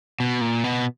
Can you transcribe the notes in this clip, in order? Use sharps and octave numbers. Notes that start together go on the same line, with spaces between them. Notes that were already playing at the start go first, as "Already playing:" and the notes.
B2
A#2
B2